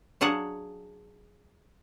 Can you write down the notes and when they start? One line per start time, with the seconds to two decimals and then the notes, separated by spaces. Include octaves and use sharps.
0.21 F#3 D4 G#4 F5 F#5